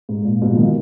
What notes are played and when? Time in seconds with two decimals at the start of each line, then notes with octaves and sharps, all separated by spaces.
0.09 G#2
0.25 A#2
0.42 G#2 B2
0.52 F3
0.57 B2 D#3